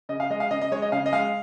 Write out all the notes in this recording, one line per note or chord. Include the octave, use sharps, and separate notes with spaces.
C#3 D#5
F5
G#3 D#5
F5
C#3 D#5
D#5
G#3 C#5
D#5
C#3 F5
D#5
G#3 F5